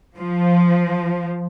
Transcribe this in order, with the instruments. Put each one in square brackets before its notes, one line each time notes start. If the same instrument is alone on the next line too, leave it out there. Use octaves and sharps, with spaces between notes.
[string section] F3